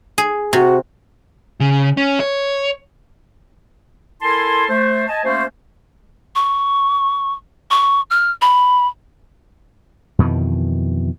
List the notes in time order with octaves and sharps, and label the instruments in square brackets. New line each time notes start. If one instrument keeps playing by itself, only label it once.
[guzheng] G#4
[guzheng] C3 [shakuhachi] F#4
[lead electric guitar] C#3
C#4
C#5
[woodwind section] E4 A4 A#4 G#5 A5 C6
A3 C5
D#5 G#5 A5
A3 A#3 C#4 F#4 C5
[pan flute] C#6
C#6
F6
B5
[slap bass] F2 B2 D#3 E3